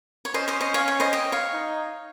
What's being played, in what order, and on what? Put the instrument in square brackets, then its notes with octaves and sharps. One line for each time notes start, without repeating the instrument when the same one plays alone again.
[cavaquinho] C#5
[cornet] C#4 [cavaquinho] C5 D#5
[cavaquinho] C5 D#5
C5 D#5
C#5 F5
C#5
C5 D#5
D#5 G5
C#5 F5
[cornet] D#4